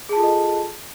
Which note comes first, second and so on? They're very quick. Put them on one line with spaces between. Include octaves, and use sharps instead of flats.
G#4 A5 F4 A4 D#5